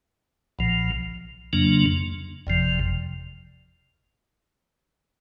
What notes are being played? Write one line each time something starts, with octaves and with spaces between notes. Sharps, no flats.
B1 A#2 F3
F2 C#3 F#3 A#3 D4
G1 F2 C3 F3